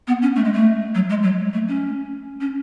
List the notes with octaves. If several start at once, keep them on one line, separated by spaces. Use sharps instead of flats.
B3
C#4
A3
G#3
A3
F#3
G#3
F#3
A3
C#4
C#4